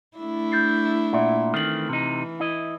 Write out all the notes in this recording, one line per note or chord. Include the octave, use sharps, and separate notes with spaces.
A3 D4 E4
G6 A6 C7
A#2 D5 E5 F#5
D#3 E3 A3 C4 F6 F#7
C3 D#4
E4 D#5